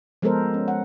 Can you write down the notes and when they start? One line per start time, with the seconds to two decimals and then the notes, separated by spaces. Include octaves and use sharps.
0.22 F3 G#3 B3 A4 A#4 C5
0.54 C#4
0.68 F#5